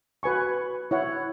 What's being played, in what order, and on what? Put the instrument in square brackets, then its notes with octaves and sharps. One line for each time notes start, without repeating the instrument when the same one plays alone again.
[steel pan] F#4 B4 G#5 C#6
E4 C#5 F#5